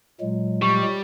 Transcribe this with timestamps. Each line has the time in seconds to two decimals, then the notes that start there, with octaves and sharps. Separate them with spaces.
0.21 A#2 F#3 G#3
0.62 G3 C#6